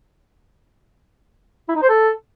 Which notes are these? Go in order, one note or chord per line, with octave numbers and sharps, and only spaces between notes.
E4
D#4
C5
A4